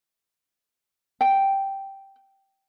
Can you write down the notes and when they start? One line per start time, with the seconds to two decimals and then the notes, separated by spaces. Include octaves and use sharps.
1.21 G5